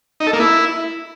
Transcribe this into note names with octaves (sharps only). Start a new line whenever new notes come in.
D#4
A4
A#3
E4